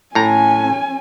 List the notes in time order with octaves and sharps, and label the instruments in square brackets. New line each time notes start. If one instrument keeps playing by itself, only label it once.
[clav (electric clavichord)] A2 A#5 [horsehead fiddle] C#4 G#5